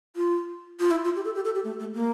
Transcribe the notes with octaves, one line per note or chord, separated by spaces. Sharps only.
F4
F4
E4
F4
G4
A4
G4
A4
G4
A3
A3
A#3